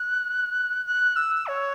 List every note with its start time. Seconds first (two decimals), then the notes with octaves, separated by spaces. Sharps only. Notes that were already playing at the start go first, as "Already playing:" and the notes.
Already playing: F#6
0.86 F#6
1.16 E6
1.47 C#5